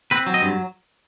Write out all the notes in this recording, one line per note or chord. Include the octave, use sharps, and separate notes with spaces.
C4 B4
F#3
D#5
G2